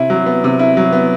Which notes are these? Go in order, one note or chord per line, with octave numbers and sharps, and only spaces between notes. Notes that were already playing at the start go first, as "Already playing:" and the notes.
Already playing: C3 E4
F#3
B3
C3
E4
F#3
B3